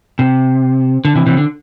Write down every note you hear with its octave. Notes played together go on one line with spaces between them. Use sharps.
C3
D3
C3 E3
C3 E3
D3